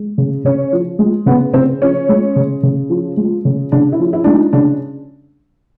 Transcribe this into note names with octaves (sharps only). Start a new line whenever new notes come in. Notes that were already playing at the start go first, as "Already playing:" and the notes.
Already playing: G#3
C#3
C#3 C#4
F3
G#3
C#3 B3
C#3 C4
F3 C#4
G#3
C#3
C#3
F3
G#3
C#3
C#3 D4
E4
F3
E4
G#3 D4
D#4
C#3 D4